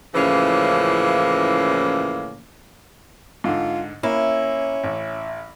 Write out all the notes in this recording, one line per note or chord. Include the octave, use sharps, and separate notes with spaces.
A2 C#3 E3 F3 A#3 C#4
G#2 D3 F4
A#3 C#4 E4
A1